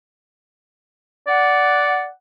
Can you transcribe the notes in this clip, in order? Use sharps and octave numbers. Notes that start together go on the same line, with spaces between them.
D5 F#5